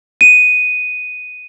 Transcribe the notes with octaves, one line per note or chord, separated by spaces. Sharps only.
D#7